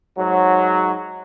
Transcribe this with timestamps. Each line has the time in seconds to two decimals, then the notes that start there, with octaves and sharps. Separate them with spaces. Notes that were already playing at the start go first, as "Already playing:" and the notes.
0.17 G#2 F#3